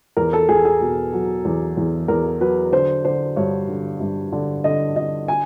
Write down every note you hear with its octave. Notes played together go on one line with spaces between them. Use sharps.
E2 A#4
A4
E2 G#4
G#4
B2
F#3
E2
E2
E2 A#4
F#3 B4
D3 C5
D3 C5
G2 C#5
D3
G2
D3
D3 D#5
D3 D#5
G#5